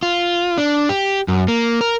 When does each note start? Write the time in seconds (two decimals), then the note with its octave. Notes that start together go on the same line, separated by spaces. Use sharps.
0.03 F4
0.58 D4
0.89 G4
1.28 F#2
1.48 A#3
1.81 A#4